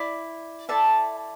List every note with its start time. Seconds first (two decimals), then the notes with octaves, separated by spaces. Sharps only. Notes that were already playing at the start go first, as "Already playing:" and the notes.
Already playing: E4 D5
0.69 E4 A4 D5 E5 A5